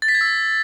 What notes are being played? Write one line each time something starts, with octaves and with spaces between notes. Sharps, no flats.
A6
B6
G#6
E6